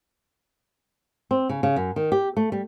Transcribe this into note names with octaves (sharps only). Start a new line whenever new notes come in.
C4
C#3
C#3
F#2
D#3
G4
A3
G3